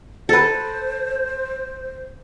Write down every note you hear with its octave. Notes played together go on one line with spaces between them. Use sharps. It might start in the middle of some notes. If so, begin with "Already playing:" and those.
A4 B4 C5